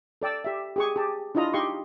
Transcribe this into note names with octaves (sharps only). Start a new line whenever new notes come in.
A4 D5 G5 E6
G4 E5
G4 G#4 C#6
G4 G#4 A5
D4 E4 F4 D#5 A#5
D#4 G4 D#5 F5 C6 C#6